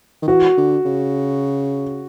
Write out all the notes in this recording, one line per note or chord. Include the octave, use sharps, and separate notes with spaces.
D#3
E3 F#4
D3
C#3